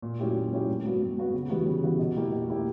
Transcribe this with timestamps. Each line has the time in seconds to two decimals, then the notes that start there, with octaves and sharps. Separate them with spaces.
0.02 A#2
0.20 F#3 C#4 E4 G4
0.35 A#2
0.52 F#3 C#4 E4 G4
0.67 G2
0.84 F#3 B3 F#4
1.01 G2
1.17 F#3 B3 F#4
1.33 C#3
1.49 E3 G3 B3 F#4
1.66 C#3
1.83 E3 G3 B3 F#4
1.99 B2
2.16 A#3 E4 G4
2.32 B2
2.48 A#3 E4 G4